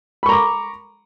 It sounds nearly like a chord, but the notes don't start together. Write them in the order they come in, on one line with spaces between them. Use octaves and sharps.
B5 C#6 A#5 D6